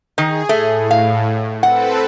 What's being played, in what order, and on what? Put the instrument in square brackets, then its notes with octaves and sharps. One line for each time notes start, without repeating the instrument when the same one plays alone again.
[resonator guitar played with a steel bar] D#3 D#4 [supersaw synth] G#4
[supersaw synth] A2 [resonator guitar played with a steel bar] A3
[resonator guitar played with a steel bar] F5
[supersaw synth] C4 A4 B4 [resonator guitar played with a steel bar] F#5